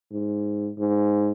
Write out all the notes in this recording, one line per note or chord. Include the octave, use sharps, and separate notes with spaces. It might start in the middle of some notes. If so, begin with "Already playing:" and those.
G#2
G#2